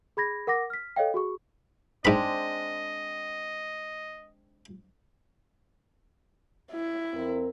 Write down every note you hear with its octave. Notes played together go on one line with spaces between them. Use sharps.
G#4 B5 G#6 A#6
A#4 F#5 D6 A#6
F6 B6
A4 C#5 D#5 F5 G5
F#4 G#4 C#6
G#2 G#3 C4 D4 D#5 B5
E4
F2 C4 A#4